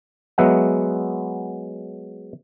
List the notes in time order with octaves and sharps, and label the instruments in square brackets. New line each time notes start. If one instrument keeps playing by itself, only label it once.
[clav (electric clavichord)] F#3 G#3 B3 E5 F#5